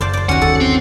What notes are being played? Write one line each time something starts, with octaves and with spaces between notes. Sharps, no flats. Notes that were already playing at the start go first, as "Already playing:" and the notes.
F#1 C5 D5 A5
C5 D5
G1 D#2 C#4 F#4 F#5
A4
C4